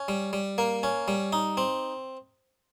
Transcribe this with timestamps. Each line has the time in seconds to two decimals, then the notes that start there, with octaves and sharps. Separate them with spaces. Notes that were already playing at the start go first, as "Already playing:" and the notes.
Already playing: C#4
0.08 G3
0.33 G3
0.58 A#3
0.83 C#4
1.08 G3
1.33 D#4
1.57 C4